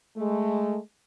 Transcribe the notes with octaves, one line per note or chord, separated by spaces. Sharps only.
G#3 A3